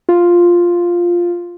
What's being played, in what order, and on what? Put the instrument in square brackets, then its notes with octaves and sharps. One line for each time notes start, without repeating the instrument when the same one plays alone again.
[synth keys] F4